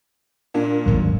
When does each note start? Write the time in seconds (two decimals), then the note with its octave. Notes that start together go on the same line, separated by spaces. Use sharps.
0.54 A#2 D4
0.86 D#1 G#1 F#3